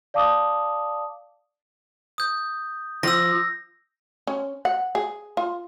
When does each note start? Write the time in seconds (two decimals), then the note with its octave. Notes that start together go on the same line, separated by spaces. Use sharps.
0.14 D5 F5 A5 D6 D#6
2.18 D#6 G6
3.03 F3 E6 A#6
4.27 C#4
4.65 F#5
4.95 G#4
5.37 F4